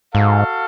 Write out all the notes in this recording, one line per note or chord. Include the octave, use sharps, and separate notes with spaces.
G#2 F#4 A4 F5